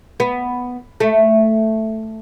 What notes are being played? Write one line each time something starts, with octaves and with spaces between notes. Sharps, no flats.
B3
A3